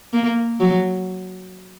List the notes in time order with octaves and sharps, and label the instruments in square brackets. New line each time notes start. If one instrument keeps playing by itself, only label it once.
[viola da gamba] A#3
F#3